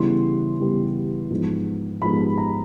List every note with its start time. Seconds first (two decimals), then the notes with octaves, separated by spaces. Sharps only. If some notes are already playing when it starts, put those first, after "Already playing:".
Already playing: C#3 E3 G3 B3 C6
0.60 C#3 E3 G3 B3
1.30 G#2 F3 G#3 B3
2.02 G#2 F3 G#3 B3 B5
2.38 A#5